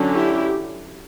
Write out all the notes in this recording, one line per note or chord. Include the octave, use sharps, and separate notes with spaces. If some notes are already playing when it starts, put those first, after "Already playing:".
Already playing: D3 F#3 C#4
E4 G4